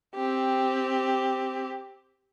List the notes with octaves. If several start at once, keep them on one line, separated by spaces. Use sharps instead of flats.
C4 G4